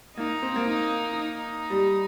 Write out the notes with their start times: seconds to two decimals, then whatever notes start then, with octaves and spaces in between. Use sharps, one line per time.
0.17 A#3 D#4
0.42 C4
0.56 A#3
0.68 D#4
1.19 D#4
1.70 G3